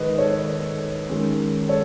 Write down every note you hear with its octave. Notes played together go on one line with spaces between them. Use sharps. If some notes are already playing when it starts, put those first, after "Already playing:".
Already playing: G#2 D#3 G#3 B4 D#5
A4 C#5
F#2 D#3 G#3
A4 C#5